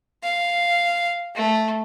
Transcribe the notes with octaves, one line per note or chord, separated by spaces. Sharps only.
F5
A3